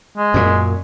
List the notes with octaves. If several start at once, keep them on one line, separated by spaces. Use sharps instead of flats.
G#3
F#2 A#2